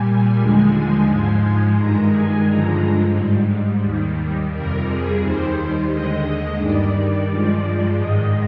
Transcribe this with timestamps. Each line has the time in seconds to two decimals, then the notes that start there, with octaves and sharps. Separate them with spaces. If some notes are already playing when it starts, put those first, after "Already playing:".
Already playing: A#2 G3 G#5
0.38 D#2 D3 F3 G#3
1.08 G#2 F3 G#3
1.77 G2 D#3 G#3 A#5
2.12 G#5
2.45 G2 D3 F3 G#3 A#5
3.14 G#2 G3
3.83 D#2 D#3 G3
4.52 F2 C3 G3 A#4
4.87 G#4
5.21 D#2 D#3 G3 C5
5.91 D#2 D3 G#3 D#5
6.59 G2 D#3 G3 D5
7.28 G2 F3 G#3
7.97 G#2 D#3 G#3 D#5